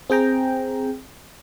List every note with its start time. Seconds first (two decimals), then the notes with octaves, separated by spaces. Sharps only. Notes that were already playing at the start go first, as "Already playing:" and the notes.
0.10 C4 G#4 G5 A#5